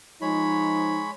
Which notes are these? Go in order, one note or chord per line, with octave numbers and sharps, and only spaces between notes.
F3 G#3 D#4 C#5 B5